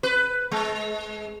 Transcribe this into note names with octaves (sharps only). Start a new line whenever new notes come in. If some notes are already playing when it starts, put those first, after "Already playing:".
B4
G#3